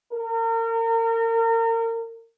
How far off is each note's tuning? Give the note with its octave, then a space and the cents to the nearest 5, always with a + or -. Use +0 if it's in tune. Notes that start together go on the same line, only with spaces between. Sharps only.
A#4 -35